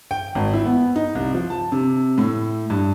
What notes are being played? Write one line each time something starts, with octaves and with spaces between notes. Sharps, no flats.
G5
G#1
E4
B3
D#4
C2
F3
A5
C3
A2
G2